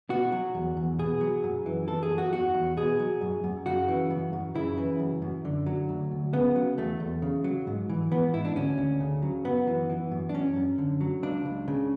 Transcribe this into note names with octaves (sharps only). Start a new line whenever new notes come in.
B2 F#4
F#3
E2
E2
B2 G#4
F#3
F#2
E3
E3 A4
G#4
F#2
F#4
E2 F#4
E2
B2 G#4
F#3
F#2
F#2
C#3 F#4
E3
F#2
F#2
C#3 E4
E3
F#2
F#2
D3
F#3
D2
D2
C#3 B3
F#3
E2 A3
E2
C#3
F#3
G#2
E3
E3 B3
G#2 E4
D4
D2 C#4
D2
C#3
F#3
F#2 B3
E3
E3
F#2
D4
F#2 C#4
F#2
D3
F#3
C#2 D4
C#2
C#3